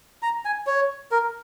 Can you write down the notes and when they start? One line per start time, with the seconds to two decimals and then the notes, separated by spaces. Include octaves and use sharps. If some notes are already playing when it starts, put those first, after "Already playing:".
0.23 A#5
0.45 G#5
0.67 C#5
1.12 A#4